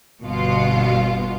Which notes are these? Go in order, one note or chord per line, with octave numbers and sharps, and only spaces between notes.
G1 B2 F4